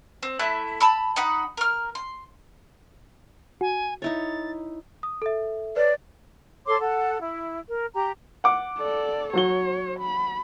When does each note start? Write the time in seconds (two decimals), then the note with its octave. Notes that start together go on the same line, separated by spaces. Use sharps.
0.23 C4
0.39 A3 E4 E5 F#6
0.80 A5 B5 E6
1.16 D#4 F#5 B5
1.57 A#4 F6
1.95 C6
3.61 F#4 G#5
4.02 D#4 E4 C#5 A6
5.03 D#6
5.22 A4 E5
5.76 B4 C#5 D5
6.66 A4 C#5 C6 D6
6.80 A4 F#5
7.21 E4
7.69 A#4
7.94 G4 A#5
8.44 F#5 D6
8.79 A4 D5
9.33 F#3 F#4 C#5 G7
10.00 B5